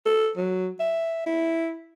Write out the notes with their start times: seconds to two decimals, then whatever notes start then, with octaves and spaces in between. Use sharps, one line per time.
0.05 A4
0.37 F#3
0.80 E5
1.26 E4